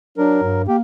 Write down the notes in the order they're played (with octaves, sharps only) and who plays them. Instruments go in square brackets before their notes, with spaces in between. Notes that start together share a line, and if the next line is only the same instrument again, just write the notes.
[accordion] F#3 A#4 [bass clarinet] D4
[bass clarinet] G2
[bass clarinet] A#3 [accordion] G4